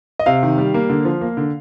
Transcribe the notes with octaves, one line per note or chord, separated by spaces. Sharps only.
D#5
C3 F5
D#3
G3
A#3
D3
F3
A#3
D3